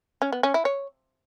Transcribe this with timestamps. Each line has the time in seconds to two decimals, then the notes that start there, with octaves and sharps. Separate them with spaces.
0.22 C#4
0.32 B3
0.43 C#4
0.54 E4
0.65 C#5